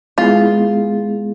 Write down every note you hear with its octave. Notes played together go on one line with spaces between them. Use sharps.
G#3 B3 E4 F4 G#4